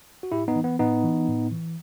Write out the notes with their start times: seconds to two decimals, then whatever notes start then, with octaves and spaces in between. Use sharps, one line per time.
0.23 F#4
0.32 A2 E4 G4
0.48 B3 D#4
0.56 E3
0.64 B3
0.80 A2 B3 D#4
1.04 E3
1.28 A2
1.52 E3